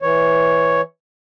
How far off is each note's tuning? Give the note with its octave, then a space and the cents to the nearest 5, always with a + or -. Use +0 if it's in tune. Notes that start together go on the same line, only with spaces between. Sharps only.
E3 +0 C#5 +0